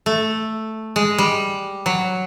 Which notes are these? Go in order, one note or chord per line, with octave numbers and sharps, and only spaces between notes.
A3
G#3
G3
F#3